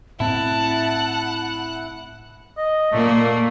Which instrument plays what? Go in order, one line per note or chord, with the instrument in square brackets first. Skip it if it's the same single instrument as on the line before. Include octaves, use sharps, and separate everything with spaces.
[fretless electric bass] A2 C4 [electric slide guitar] E4 [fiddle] F#5 [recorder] A5
[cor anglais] D#5
[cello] A#2 A#3 [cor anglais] A3